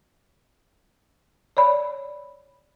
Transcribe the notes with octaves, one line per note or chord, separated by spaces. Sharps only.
C#5 D5 B5